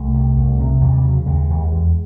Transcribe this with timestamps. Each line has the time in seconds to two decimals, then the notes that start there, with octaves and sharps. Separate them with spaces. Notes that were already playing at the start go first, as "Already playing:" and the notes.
Already playing: C2 A3
0.14 C3
0.37 C2
0.59 C3
0.81 D#2 G#3
0.93 G3
1.04 C#3 F#3
1.26 D#2 G#3
1.50 D#2
1.72 E2